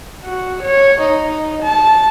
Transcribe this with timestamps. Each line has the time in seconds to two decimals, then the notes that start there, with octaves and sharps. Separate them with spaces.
0.24 F#4
0.63 C#5
1.01 D#4
1.63 A5